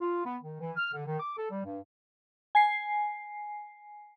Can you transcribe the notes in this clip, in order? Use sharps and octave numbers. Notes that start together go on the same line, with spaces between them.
F4
B3
D#3
E3
F6
D3
D#3
D6
A4
G3
G2
G#5 C7